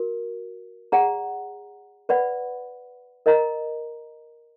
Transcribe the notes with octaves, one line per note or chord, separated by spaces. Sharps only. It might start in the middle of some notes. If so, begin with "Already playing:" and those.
Already playing: F#4 A#4
G#4 D5 F#5 A#5
B4 D5 F#5 B5
A#4 D#5 A#5